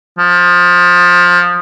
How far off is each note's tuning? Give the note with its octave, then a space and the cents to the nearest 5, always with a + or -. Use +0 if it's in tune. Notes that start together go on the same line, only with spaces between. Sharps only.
F3 +20